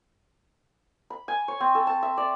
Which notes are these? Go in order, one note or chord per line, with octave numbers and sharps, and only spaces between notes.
B5
G#5
C#5
C4
A4
A5
E5
D5